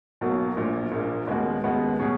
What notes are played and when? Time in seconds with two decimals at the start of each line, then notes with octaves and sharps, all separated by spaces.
0.21 B1 B2 F#3 A#3
0.57 A#1 A#2 A#3
0.92 A#1 A#2 A#3
1.27 D#2 C#3 G#3 B3 F#4
1.64 D#2 C#3 G#3 B3 F#4
1.99 B2 F#3 C#4 G#4